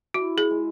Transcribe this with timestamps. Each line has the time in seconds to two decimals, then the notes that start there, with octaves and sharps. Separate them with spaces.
0.14 E4 F#4
0.38 G#4
0.51 G#3